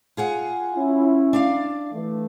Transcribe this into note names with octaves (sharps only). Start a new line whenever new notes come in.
F4 G#4 F#5
C#4 E4
D4 D5 F5
E3 A3